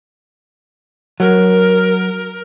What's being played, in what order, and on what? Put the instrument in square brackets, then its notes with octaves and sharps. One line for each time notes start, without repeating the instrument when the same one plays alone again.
[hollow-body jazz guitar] F#3 [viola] A#4